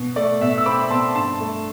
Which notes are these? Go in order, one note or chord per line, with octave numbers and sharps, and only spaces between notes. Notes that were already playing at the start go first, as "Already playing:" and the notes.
Already playing: B2
A3 D5
B2 E5
E6
C4 B5 D6
B2 A5 C6
G2 A5 C6
A3